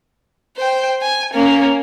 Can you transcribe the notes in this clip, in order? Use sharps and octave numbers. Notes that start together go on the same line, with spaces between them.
C5 G5
G#5
A#3 C#4